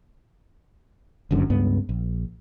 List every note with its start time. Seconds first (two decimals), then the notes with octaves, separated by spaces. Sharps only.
1.31 G1 C#2 F#2 D3
1.50 C#2 G2 B3
1.89 A#1